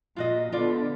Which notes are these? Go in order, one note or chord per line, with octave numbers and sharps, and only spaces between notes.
A#2 F4 F#4 D#5
D3 B3 F4 D5